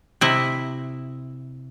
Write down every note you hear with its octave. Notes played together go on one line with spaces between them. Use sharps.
C3 E4 D#5